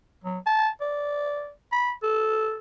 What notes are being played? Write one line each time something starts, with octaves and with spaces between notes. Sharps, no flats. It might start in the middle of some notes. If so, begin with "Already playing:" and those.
F#3
A5
D5
B5
A4